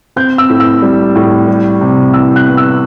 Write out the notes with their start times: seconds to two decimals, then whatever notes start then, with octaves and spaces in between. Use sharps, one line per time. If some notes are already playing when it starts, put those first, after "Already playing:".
0.16 C4 G6
0.38 E6
0.50 A2
0.60 E6
0.82 G3
1.15 A2
1.48 G3
1.81 C3
2.14 E3 E6
2.36 F#6
2.47 B3
2.57 E6